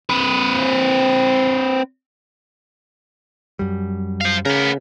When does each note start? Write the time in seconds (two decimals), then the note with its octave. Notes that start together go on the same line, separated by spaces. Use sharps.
0.10 C4 B4
3.59 F#2 G3
4.21 C5 F5
4.45 C#3 B3 A#4